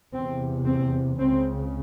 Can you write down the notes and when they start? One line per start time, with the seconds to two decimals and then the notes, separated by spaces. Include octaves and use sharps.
0.13 E2 C3 C4
0.66 C4
1.19 C#2 C#3 C4